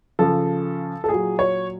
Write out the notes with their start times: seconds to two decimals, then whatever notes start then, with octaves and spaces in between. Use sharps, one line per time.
0.19 C#3 F3 A4
1.04 A4
1.08 A#2 F#3 G#4
1.39 C#5